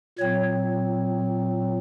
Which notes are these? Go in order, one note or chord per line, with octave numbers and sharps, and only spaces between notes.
A#2 F#3 C4 C#5